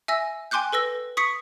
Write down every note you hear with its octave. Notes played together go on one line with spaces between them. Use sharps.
E5 G#5 E6 A#6
G5 G#5 C6 D6 F#6 G6
A4 B4 E6 A#6
C#6 D#6 B6 C#7